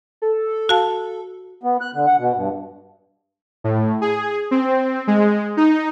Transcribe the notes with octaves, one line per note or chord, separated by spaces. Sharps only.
A4
F#4 F5 A5
B3
F#6
D3
F#5
B2
G2
A2
G#4
C4
G#3
D#4